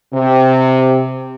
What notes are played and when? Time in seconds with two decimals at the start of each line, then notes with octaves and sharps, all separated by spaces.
0.14 C3